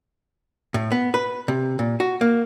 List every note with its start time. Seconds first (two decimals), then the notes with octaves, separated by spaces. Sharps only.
0.74 A2
0.92 B3
1.14 B4
1.48 C3
1.79 A#2
2.00 F#4
2.21 A#3